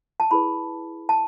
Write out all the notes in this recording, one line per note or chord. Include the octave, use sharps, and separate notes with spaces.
A5
E4 G#4 B4 B5
A5